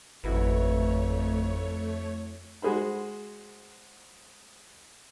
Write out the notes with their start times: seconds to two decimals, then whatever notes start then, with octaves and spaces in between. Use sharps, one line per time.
0.24 G#1 F2 A3 E4 F#4 B4 C#5
2.62 G#3 F#4 G#4 C5 B5